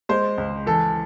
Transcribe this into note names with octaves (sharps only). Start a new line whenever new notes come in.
G#3 C5
C#2
E3 A4